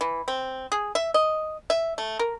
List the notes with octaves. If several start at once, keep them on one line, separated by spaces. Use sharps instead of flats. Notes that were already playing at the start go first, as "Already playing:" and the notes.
E3
C4
G#4
E5
D#5
E5
A3
A#4